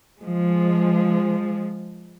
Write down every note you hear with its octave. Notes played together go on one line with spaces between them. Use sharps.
F3 G#3